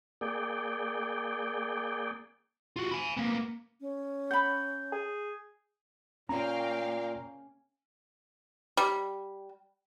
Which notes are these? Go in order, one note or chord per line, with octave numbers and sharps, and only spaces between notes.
A#3 G#4 D5 G5
F4 F#4
G#5 B5
A#3 B3
C#4
F#5 B5 G6
G#4
A#2 A#3 C#4 F5 G5 A#5
G3